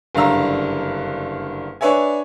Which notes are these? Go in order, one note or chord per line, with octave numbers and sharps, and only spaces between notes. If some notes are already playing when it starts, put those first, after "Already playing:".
F#1 G2 D3 F5 A#5 E6
D4 B4 C#5 E5 G#5